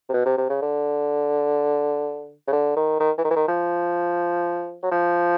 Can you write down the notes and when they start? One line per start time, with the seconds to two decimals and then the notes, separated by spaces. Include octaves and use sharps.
0.09 C3
0.13 B2
0.26 C3
0.38 C3
0.50 C#3
0.62 D3
2.47 C#3
2.52 D3
2.76 D#3
3.00 D#3
3.18 E3
3.24 D#3
3.30 E3
3.36 D#3
3.48 F3
4.83 F#3
4.91 F3